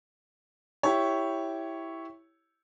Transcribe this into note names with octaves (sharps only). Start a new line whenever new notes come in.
E4 G4 C#5